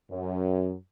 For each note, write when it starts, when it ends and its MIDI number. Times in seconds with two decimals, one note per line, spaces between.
0.11 0.74 42